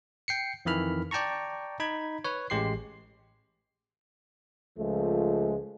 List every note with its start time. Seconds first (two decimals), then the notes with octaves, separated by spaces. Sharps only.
0.28 G5 C7 C#7
0.65 F2 D#3 E3 B5 F6
1.11 D5 G5 A5 A#5 C#6
1.80 D#4 B5 G#6
2.24 B4 C#5
2.50 A1 G#3 G4 C6 C7
4.79 C#2 F3 G#3 A3